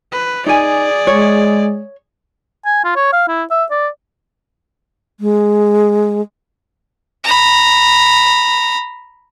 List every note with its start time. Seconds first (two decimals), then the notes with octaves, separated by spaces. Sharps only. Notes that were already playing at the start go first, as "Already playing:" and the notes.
0.12 B4
0.46 D#4 G#4 D5 G#5
1.07 G#3 C#5
2.66 G#5
2.85 F4
2.96 C#5
3.13 F5
3.28 E4
3.51 E5
3.71 D5
5.20 G#3
7.24 A#5 B5